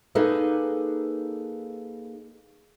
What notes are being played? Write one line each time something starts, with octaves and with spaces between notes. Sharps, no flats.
A#3 D#4 G#4 A4 B4